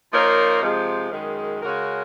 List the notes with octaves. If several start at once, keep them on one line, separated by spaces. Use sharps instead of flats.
F3 A#3 D#4 A#4 C#5
C3 F3 G#3
F#2 D#3 G#3
C#3 G#3 C#4 F#4 A#4